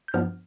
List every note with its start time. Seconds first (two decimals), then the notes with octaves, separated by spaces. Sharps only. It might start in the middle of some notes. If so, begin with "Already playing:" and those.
0.08 G6
0.14 G2 F3 B3 D4 F6